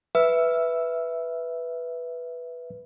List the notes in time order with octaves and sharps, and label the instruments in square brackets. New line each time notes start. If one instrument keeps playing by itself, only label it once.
[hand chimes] B4 [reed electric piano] E5 E6